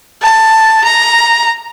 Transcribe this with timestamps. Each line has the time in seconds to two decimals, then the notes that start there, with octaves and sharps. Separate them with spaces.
0.22 A5
0.84 A#5